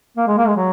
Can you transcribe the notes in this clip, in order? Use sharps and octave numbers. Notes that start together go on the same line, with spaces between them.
A#3
G#3
A#3
G#3
F#3